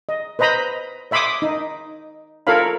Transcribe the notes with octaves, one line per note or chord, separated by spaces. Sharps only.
D#5
B4 C5 D#5 A#5 B5
C#5 E5 B5 C6 D6 D#6
D#4
F4 A4 A#4 C#5 F5 B5